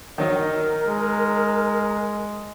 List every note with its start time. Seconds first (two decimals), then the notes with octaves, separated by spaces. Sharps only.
0.18 D#3 F#3 D#4 A#4
0.88 G#3